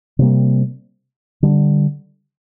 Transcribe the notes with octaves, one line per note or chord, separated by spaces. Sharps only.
C3 G3 A#3
D3 G3 D4